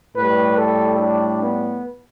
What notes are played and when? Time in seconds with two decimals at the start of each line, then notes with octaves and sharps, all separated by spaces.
0.15 A2 G3 B4
0.57 A4
0.98 D4
1.41 B3